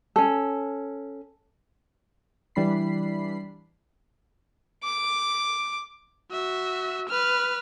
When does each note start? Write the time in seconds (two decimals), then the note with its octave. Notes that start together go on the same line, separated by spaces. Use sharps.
0.16 C#4 A4
2.55 E3 G3 D4 B5 C7
4.83 D6
6.32 F#4 E5
7.09 B4 F6